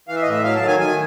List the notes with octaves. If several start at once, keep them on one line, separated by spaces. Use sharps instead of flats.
E3 F5
E5
D#5
A2 E5
F#3 F5
A5
D#3
G#5
D#3 G#5